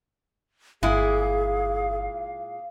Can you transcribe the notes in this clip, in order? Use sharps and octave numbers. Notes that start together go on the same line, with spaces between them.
G1 A#2 G#3 E4 G#4 F5